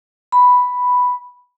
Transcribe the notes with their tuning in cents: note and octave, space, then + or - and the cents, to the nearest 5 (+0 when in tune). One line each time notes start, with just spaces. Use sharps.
B5 +0